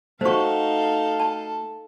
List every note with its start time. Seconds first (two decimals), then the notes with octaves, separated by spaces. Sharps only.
0.21 A3 D#4 F#4 A4 C5 F5 C#6
1.20 A5